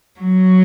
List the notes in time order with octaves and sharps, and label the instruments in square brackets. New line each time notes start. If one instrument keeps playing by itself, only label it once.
[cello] F#3